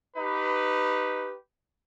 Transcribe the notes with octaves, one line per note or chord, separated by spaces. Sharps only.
D#4 G4 B4